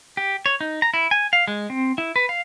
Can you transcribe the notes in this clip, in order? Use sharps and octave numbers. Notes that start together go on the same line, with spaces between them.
G4
C#5
D#4
A#5
E4
G#5
F5
G#3
C4
E4
B4
F5